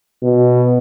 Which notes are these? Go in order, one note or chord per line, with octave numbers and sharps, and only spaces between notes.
B2